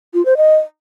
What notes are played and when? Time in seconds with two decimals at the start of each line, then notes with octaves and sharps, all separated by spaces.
0.14 F4
0.26 C5
0.37 D#5